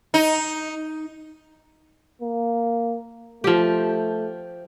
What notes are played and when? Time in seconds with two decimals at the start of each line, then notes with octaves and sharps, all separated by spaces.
0.14 D#4
2.21 A#3
3.44 F3 A3 G4